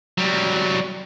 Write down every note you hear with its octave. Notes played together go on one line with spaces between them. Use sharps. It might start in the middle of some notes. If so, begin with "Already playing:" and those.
F#3 G3